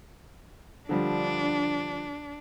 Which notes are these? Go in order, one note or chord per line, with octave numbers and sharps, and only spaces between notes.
D3 F3 G3 D4